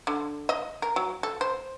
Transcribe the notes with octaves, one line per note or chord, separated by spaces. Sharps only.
D3
D#5
A#4
F#3
A4
C5